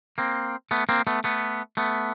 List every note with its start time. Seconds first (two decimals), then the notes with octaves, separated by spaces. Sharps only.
0.18 A#3 C4
0.71 A3 B3
0.89 A#3 C4
1.07 A3 B3
1.24 A3 B3
1.77 A3 B3